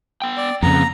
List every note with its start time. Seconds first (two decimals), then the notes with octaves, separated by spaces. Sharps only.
0.22 B3 G5
0.37 D5
0.63 F2 C#3 A#3 B3 A#5